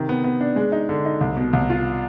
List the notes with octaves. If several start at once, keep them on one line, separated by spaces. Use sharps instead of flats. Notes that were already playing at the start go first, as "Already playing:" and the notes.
Already playing: C3 D#3
B3
B3
D4
G#3
D#4
D3
D#4
C2
B2
C2
F4